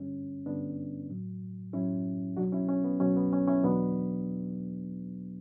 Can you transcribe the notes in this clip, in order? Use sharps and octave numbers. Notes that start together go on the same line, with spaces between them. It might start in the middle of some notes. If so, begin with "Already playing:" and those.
Already playing: G2 D3 G3 C#4
G2 D3 G3 B3 D4
A2 F#3
A2 F#3 C#4 E4
C#2 B2 F#3 D4 F#4
C#4 E4
C#4
B3
C#2 B2 F#3 C#4
B3
C#4
C#4 E4
E2 B2 F#3 B3 D4